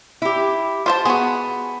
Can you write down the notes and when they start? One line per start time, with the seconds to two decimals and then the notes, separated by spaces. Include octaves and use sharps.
0.22 E4 G4
0.86 F4 C5 A5
1.05 B3 F#4 G#4